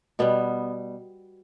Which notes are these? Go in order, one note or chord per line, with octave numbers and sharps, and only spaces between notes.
B2 G3 B3